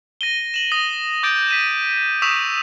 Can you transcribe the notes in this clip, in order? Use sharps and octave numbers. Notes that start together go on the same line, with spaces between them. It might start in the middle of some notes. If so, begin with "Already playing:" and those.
A#6 D#7 G7
E7 F#7
D#6 A#6
D6 G6 A6 D7
B6 D#7 E7
C#6 D#6 E6 B6 E7 F7